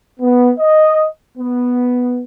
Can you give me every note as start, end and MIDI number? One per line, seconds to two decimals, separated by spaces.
0.20 0.51 59
0.59 1.06 75
1.37 2.24 59